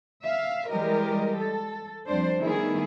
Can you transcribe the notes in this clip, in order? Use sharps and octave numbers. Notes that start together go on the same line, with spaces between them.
E5 F5
E3 G3 G#3 G4 A#4 D#5
A4
F2 G3 D4 C5 D5
D#3 G3 A3 B3 E4 G#4